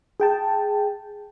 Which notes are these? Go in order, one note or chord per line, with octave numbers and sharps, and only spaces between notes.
G#4 G5 A5